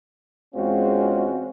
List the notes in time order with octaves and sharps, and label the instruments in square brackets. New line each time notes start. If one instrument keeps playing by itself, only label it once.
[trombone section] E2 G#3 C4 C#4 F4 F#4